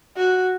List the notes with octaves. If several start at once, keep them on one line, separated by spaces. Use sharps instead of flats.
F#4